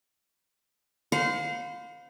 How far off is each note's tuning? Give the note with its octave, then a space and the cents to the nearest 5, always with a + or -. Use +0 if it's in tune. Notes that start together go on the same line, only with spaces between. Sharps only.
C5 -25 F5 +30 B5 +0